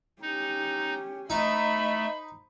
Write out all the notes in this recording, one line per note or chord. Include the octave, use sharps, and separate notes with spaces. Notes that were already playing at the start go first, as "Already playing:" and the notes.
C#4 D#4 G4
A3 D#4 C5 D#5 B5